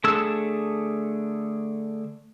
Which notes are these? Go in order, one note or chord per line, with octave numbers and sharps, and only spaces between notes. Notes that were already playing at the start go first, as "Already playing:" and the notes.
D3 A3 G#4 A5 E6